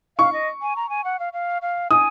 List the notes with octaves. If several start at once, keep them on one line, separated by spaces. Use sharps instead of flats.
F5 C#6
D#5
G#5
A#5
G#5
F#5
F5
F5
F5
G#5 D#6